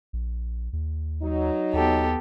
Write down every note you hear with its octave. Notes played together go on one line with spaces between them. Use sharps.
A#1
D#2
F#3 D#4
D#2 B3 G4 A4